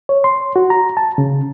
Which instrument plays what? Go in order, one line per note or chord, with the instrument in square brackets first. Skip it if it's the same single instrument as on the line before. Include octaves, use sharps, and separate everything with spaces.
[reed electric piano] C#5
C6
F#4
A#5
A5
C#3